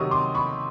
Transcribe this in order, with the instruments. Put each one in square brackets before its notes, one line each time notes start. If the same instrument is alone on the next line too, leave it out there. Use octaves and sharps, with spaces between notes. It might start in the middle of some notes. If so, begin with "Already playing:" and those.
Already playing: [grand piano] C3 D#3 F#3 C#6 D#6
C6 D6
B5 C#6